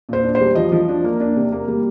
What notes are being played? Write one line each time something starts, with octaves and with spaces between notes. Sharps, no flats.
A#2 C5
D4
C5
G3
F3 D#5
F3
D4
A#3
D4
C3
A#3
G3